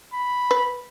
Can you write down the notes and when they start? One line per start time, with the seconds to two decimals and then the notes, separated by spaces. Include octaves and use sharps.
0.14 B5
0.51 B4